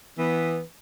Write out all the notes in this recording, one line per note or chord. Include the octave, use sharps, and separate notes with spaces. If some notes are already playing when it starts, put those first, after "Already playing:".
E3 B3